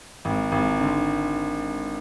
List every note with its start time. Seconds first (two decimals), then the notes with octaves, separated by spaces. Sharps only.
0.25 G#1
0.52 G#1
0.80 D3